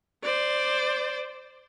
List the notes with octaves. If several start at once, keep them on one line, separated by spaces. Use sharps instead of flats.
C5 D5